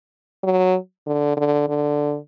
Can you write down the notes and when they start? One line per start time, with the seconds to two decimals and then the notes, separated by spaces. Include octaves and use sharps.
0.43 F#3
1.06 D3
1.37 D3
1.68 D3